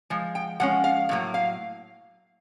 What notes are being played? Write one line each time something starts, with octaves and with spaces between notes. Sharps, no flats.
F3 G#3
G5
F3 G#3 C#4 F#5
F5
A2 F#3 A#3
F5